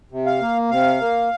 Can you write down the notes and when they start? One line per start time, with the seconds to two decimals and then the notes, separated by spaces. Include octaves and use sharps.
0.12 C3
0.26 F5
0.41 A#3
0.71 C3 F5
1.00 A#3